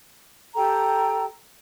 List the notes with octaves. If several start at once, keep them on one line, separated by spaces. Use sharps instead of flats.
G4 A4 G5 A#5